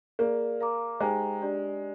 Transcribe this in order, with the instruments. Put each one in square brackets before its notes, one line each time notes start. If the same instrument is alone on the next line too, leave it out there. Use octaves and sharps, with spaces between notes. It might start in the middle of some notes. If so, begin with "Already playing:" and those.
[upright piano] A#3 [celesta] G#4 D5 F5
[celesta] A#4 F5 A#5 D6
[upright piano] G#3 [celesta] D#4 G4 C5 G5 A#5
[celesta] D4 G4 D5